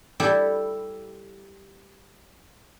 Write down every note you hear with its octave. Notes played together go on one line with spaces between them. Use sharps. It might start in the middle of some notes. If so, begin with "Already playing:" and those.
G3 E4 G4 A4